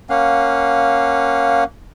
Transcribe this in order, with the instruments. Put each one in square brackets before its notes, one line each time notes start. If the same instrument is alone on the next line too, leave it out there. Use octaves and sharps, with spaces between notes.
[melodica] A#3 C#4 F5 F#5